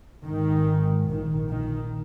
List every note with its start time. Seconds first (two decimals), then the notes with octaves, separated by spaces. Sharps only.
0.24 G#1 G#2 D#3
1.09 A#1 A#2 D#3
1.51 D#3